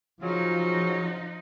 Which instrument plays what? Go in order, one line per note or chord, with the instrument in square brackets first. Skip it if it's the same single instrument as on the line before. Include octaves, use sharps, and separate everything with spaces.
[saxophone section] C#3 F#3 [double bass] F3 [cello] D#4 F4